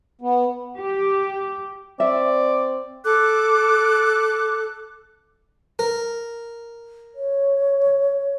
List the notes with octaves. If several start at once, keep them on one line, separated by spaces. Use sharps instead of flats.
B3
G4
C4 D5 E5
A4 D6 F#6
A#4
C#5